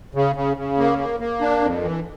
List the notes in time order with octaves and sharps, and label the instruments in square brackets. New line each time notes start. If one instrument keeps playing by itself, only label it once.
[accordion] C#3
C#3
C#3
A#3
A#3
A#3
D4
F2
E3